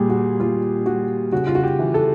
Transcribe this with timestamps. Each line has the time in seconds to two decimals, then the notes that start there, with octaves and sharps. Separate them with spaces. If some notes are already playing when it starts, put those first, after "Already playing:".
Already playing: A#2 G3 G4 G#4
0.09 F#4
0.40 A#2 F4
0.86 G3 F#4
1.32 C#3 F#4
1.47 F4
1.55 F#4
1.63 G4
1.79 E3
1.94 A4